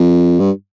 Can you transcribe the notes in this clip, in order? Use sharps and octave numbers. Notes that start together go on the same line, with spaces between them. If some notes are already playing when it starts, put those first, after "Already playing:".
Already playing: F2
G2